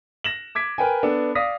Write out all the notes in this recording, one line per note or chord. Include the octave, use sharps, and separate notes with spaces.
A#6 E7 F#7
D6 G#6 B6 D7
A#4 B4 G5 G#5
B3 D4 A4
D5 F5 D#6 A#6 B6